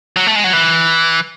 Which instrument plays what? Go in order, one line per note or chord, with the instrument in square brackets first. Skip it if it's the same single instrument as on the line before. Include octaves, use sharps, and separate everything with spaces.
[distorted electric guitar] F#3
A3
G#3
F#3
E3